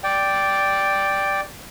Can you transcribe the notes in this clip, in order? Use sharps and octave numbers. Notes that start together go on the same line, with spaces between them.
D5 G5